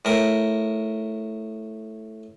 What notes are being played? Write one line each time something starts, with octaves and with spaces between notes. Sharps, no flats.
A2 A#4